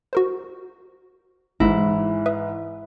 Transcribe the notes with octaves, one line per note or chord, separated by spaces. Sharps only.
F#4 A#4 C5
G#1 G#2 E3 E4 A#6
B4 E5 D#6